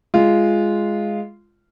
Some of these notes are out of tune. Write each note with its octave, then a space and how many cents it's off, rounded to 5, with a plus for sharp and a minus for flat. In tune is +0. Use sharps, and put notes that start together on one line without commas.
G#3 +0 F4 -15